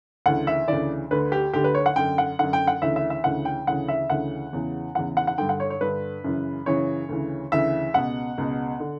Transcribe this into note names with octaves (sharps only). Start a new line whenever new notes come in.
D2 C#3 E3 F#5
E5
D2 C#3 E3 D5
D2 D3 B4
G4
D2 D3 G4
B4
C#5
F#5
F#2 D3 G5
F#5
F#2 D3 F#5
G5
F#5
D2 C#3 E3 E5
E5
E5
D2 C#3 E3 F#5
G5
D2 C#3 E3 F#5
E5
D2 C#3 E3 F#5
E2 C#3 E3
E2 C#3 E3 F#5
F#5
F#5
G2 D3 G5
F#5
C#5
C#5
G2 D3 B4
F#2 C#3 E3
F#2 C#3 E3 C#5
D2 C#3 E3
D2 C#3 E3 E5
C#2 B2 F#5
C#2 B2
D3